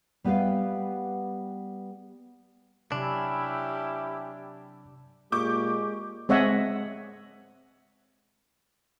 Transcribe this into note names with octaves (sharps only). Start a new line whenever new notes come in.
G3 B3 G4 B4 E5 F5
C3 F#3 C#4 D4 E4 G4
A#2 G#3 G4 C#6 D6 G6
G#3 C4 C#5 D#5 E5 F#5